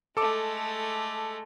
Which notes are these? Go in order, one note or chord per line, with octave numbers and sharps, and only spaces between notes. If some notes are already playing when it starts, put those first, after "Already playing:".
G#3 A3 A4 D6